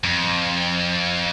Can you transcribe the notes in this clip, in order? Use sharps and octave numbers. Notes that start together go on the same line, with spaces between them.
F2